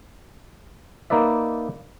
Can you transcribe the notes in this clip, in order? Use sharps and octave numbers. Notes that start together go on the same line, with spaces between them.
A#3 D#4 B4 D5 E5